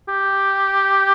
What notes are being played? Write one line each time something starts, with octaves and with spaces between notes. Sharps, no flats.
G4